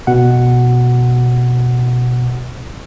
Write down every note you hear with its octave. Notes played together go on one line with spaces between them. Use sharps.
B2 F#5